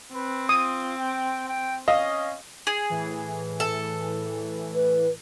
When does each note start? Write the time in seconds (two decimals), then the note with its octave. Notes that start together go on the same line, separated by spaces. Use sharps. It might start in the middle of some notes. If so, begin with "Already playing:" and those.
0.14 C4 B4
0.49 F4 D#6
0.97 G5
1.48 G5
1.88 C#4 D#5 F5
2.67 G#4
2.90 A2 E3
3.60 A4
4.75 B4